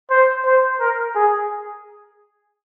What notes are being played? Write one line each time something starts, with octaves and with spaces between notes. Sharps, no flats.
C5
C5
A#4
G#4